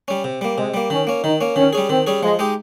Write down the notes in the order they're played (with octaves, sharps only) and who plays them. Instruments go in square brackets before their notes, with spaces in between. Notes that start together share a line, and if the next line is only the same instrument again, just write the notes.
[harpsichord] G3 C#4
C3
G3 A#3
[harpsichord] C3 [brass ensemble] G#3
[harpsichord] G3 A#3
[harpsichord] D#3 [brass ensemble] C#4
[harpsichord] A#3 C#4
[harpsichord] D#3 [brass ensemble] D#4
[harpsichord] A#3 C#4
[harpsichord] D#3 [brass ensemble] C#4
[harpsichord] G3 C#4 G#4
[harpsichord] D#3 [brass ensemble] C4
[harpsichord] G3 C#4 G#4
[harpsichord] F3 [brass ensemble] G#3
[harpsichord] G#3 D#4 G4